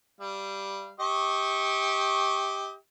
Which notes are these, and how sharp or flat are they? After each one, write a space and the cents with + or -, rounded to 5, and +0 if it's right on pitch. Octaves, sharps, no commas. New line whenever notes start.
G3 +0 F5 -30
G4 +5 D#5 +40 C#6 -15